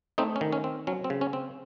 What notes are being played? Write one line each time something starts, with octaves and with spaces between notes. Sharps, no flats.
A3 C4 D#4
C#4
D#3
C#4
C4
F#3 C#4
C4
C#3
C#4
C4